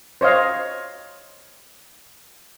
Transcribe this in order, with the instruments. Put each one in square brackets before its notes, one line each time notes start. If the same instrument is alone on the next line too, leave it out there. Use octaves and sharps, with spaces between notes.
[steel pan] C5 C#5 D#5 F5